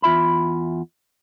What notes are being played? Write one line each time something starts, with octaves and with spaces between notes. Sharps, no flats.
E2 F4 E5 B5